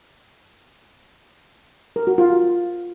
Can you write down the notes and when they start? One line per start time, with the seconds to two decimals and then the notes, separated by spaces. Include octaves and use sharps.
1.96 A#4
2.07 F#4
2.18 F4